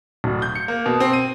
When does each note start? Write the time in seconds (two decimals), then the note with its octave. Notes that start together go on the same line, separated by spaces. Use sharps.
0.24 D1
0.42 G6
0.55 C#7
0.68 A#3
0.86 B2
1.00 C4
1.13 D#7